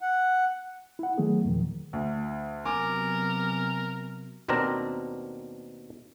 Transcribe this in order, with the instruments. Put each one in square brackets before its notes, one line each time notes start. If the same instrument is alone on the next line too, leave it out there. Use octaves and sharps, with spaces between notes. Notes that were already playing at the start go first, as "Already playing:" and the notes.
[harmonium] F#5
[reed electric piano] E4 F#5
D#3 F#3 A3 B3 G#4
E2 A#2 D#3 F3
[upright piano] D2
[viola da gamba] C3 F#3 B3 [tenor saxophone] A#4 [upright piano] G#5 D6
[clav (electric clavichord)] D#2 B2 C4 D4 A#4 A#5